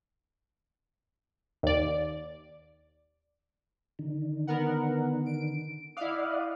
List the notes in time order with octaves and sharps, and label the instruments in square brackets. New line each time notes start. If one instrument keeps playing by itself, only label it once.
[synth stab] D#2 D5
[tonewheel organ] D3 D#3
[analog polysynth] B3 A#4 F#5
D7
[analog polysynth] E4 F5 [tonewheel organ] D5 D#5 F#5